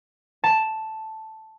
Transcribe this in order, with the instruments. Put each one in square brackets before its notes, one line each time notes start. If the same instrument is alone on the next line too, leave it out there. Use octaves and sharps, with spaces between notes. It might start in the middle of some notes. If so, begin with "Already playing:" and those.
[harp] A5